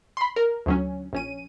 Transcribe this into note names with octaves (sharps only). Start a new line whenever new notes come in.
B5 C6
A#4
D2 F#3 C#4
A#1 C#4 D#7